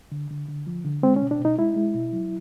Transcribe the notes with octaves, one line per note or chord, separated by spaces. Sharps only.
D3
D3
D3
F3
D3
G#3 C4
C#4
B2
D4
B2
D#4
G#3 E4
G#3
B2
F#3